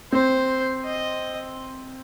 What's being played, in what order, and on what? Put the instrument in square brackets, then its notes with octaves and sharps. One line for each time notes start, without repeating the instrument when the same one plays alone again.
[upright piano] C4 [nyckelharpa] C5
[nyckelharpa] D#5